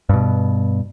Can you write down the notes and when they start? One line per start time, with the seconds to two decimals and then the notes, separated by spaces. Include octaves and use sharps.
0.09 G2 B2